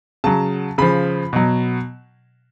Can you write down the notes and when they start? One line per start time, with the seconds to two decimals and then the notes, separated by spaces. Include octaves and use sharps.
0.24 C#3 F#3 A5
0.78 C#3 F3 B5
1.33 B2 F#3